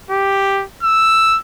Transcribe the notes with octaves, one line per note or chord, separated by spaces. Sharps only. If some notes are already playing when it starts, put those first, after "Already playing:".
G4
E6